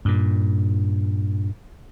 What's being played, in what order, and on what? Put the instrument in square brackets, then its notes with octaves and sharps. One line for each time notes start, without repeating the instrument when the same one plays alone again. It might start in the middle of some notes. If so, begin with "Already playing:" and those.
[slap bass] G2 A#2